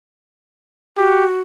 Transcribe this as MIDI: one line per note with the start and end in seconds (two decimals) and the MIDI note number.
0.98 1.41 66
0.98 1.25 67